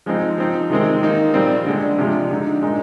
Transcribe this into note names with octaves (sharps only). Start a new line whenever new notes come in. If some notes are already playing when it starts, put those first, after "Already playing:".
F3 G#3 C4 D#4
F3 C4 D#4
C3 D#3 G#3 C4
D#3 A#3 D#4
A#2 G3 C4
D3 G#3 D4
C3 F3 G#3 D4
D3 G#3 D#4
A#2 G#3 D#4